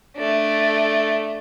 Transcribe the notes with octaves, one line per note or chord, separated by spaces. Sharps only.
A3 D4